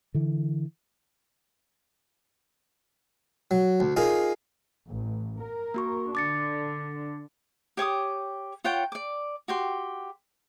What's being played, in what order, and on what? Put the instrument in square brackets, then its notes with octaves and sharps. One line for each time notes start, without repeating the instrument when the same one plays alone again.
[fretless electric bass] D3 E3
[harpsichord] F#3
D2
D#4 F4 G#4 A#4
[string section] A1
A#4
[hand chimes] A#3 F#4 C#6
[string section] D3 D4 [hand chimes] D6 A6 C#7
[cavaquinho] G4 C#5 D6 D#6
F4 C#5 F#5 G5
D5 D6
F#4 G4 C6